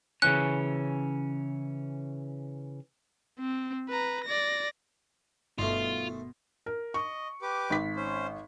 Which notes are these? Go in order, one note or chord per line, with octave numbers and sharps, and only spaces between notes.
C#3 E3 C#4 F#6
C4
B4 A#5
D5 A#6
G1 G2 B2 D#3 A3 F4 D5 C6
A#4
D#5 C#6
G4 B4 D6
G#1 B6
C#4 C5